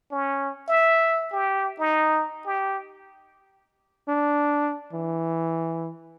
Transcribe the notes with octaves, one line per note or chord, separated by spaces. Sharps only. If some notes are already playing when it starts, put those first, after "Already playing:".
C#4
E5
G4
D#4
G4
D4
E3